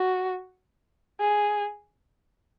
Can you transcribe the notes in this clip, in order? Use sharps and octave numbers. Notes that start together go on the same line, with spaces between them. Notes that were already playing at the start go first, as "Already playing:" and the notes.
Already playing: F#4
G#4